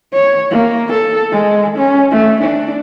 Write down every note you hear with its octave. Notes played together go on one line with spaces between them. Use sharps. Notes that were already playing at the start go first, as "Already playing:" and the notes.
C#5
A#3
A4
G#3
C#4
A3
D4